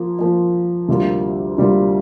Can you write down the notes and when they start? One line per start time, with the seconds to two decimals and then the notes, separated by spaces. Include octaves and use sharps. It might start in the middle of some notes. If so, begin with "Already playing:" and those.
Already playing: F3 A#3 F4
0.19 F3 A#3 F4
0.88 D2 C3 G3 A#3 F4
1.58 D2 C3 G3 A#3 F4